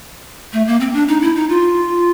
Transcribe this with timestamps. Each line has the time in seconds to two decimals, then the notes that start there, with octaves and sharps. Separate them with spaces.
0.53 A3
0.67 A#3
0.80 C4
0.94 D4
1.08 D#4
1.22 E4
1.36 D#4
1.49 F4